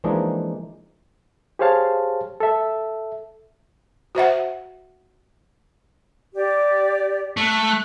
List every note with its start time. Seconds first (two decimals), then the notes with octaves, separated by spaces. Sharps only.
0.04 E3 F3 G#3 A#3 D4 D#4
1.59 G4 G#4 C5 C#5 F5 A5
2.40 A4 E5
4.15 F#4 C5 E5 F#5
6.35 G4 D5
7.37 A3 F#6